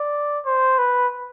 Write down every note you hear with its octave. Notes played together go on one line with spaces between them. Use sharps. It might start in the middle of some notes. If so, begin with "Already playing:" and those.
Already playing: D5
C5
B4